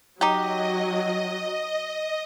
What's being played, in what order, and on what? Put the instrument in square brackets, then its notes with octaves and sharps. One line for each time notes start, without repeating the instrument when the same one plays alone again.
[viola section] F#3 [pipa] D#4 G4 [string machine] D#5